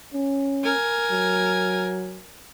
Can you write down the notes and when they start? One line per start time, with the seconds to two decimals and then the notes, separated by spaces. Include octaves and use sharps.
0.14 C#4
0.64 A#4 G#5
1.11 F#3